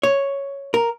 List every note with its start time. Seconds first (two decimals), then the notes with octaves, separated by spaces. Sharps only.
0.03 C#5
0.74 A#4